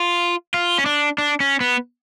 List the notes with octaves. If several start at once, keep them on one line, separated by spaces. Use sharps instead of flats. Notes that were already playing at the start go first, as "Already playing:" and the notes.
Already playing: F4
F4
C#4
D4
D4
C#4
B3